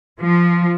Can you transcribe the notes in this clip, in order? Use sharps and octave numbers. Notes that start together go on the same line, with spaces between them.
F3